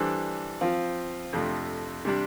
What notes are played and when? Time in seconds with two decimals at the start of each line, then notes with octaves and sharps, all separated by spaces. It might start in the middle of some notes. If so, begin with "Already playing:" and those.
Already playing: E3 G3 D4 A4 C5
0.61 F3 C4 F4
1.33 F2 C3 F3 A3 D4
2.05 C3 G3 D4